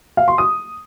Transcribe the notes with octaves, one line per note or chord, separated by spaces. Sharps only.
F5
C6
D#6